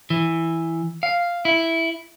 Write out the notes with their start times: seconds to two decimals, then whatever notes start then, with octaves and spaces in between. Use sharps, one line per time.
0.10 E3
1.03 F5
1.45 E4